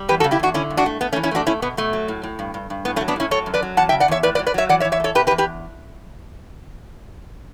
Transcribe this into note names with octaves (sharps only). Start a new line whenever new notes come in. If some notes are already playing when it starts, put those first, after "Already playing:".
Already playing: G3
E2 G4 B4
F#4 A4
C#3
E4 G4
E2 D4 F#4
D3 C#4 E4
G2
D4 F#4
A3
A3 B3
A3 C#4
E3
C#4 E4
A3 D4 F#4
A3 C#4 E4
B2 B3
B2 A3
F#3
A2
A2
G2
G2
G2
A2 B3
A3 C#4
F#3
B3 D4
A2 C#4 E4
F#3 A4 C#5
F#2
B4 D5
F#3
E2 F#5 A5
E5 G5
C#3
D5 F#5
E2 C#5 E5
A2 B4 D5
B4 D5
F#3
B4 D5
F#3 C#5 E5
E3 D5 F#5
C#5 E5
E3
C#5 E5
A3
A4 C#5
B2 G4 B4
G4 B4
E2
G4 B4